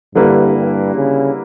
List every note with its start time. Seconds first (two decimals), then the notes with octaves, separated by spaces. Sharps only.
0.15 G2 D3 G3 A#3 E4 B4
0.55 G2
0.95 C#3